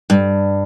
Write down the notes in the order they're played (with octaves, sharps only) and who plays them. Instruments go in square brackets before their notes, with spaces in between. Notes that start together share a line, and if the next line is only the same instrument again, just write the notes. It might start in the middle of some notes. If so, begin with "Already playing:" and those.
[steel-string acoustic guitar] G2